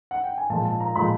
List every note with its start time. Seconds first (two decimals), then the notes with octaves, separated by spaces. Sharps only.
0.11 F#5
0.24 G5
0.38 G#5
0.50 A#2 F3 G#3 A5
0.65 A5
0.80 A#5
0.96 A#2 F3 G#3 B5